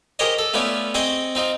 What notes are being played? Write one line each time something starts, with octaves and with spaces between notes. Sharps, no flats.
G4 G#4 A#4 C5 C#5 D#5
A4
A3 B3 C#4 F4 C#5 D5
C4 G#4 C5 D#5 C#6
C4 D#4 F4